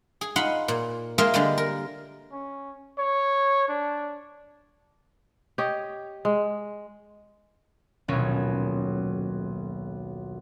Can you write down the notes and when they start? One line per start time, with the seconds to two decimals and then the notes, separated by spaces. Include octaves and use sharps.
0.21 G#4
0.36 D#4 F4 F#5 B5 C6
0.68 A#2
1.18 G#3 A#3 F4 A#4 D#5 E5
1.34 D3 G3 G#3
1.58 A#4
2.32 C#4
2.98 C#5
3.68 D4
5.58 G4 C#5 D#5
6.25 G#3
8.08 D#1 B1 F#3 C#4